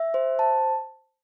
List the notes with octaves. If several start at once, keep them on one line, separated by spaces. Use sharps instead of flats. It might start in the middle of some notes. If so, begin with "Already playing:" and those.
Already playing: E5
C5
A5